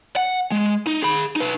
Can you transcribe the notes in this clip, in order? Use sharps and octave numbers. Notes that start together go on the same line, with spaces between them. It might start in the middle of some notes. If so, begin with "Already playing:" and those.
F#5
G#3
D#4
G#4 B5
D#4 B4